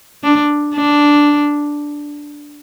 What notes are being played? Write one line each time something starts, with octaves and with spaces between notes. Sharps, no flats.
D4
D4